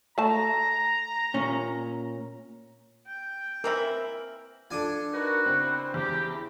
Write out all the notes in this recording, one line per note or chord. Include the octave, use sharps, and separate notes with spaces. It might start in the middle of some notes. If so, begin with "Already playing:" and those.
A3 A5 A#5
A#2 C#4
G5
E3 C4 E4 A#4
D4 F4 A4 G#5
D#4 F#4 A#4 B4
C#3 C4 E4 C5
E2 G4